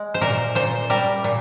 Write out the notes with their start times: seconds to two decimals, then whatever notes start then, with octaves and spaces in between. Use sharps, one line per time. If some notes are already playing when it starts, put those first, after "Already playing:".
Already playing: G#3
0.14 C5
0.21 A#2 A#4
0.55 A#2 C5
0.90 G3 A#4
1.24 A#2